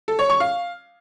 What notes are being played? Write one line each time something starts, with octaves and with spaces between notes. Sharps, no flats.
A4
C#5
C#6
F5